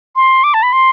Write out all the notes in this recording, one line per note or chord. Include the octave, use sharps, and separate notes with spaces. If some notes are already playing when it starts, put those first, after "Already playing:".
C6
D6
A5
B5
C6